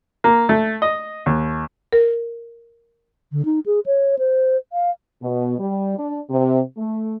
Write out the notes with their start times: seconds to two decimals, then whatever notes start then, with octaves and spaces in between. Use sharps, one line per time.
0.24 A#3
0.49 A3
0.82 D#5
1.26 D#2
1.92 A#4
3.32 D3
3.45 D#4
3.66 G#4
3.86 C#5
4.19 C5
4.73 F5
5.22 B2
5.58 G3
5.97 D4
6.30 C3
6.77 A3